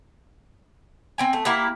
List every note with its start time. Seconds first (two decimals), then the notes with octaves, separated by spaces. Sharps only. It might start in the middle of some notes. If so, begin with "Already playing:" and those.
1.18 C4 G5 G#5
1.33 A3
1.45 A#3 E4 G4 F#5